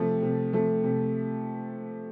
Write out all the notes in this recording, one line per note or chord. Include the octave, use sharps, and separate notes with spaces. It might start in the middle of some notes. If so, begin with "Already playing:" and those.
Already playing: C3 F3 A3
C3
F3 A3
C3